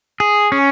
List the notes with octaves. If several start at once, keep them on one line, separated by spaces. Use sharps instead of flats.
G#4
C#4